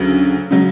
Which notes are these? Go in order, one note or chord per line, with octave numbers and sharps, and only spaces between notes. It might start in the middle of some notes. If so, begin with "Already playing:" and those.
Already playing: D2 C#3 F#3
C#3 F#3